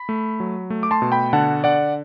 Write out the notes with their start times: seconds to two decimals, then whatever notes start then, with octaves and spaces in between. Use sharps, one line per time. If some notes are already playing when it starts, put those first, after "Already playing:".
Already playing: B5
0.09 A3
0.40 F#3
0.70 A3
0.83 D6
0.91 A5 C6
1.02 B2
1.12 G5 B5
1.33 D3 F#5 A5
1.64 D3 D5 F#5